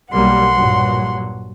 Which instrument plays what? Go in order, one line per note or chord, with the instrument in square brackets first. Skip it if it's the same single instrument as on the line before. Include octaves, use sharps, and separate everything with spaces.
[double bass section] B1 G3 A#3 [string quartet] F#5 C6
[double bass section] G2 A#2 F#3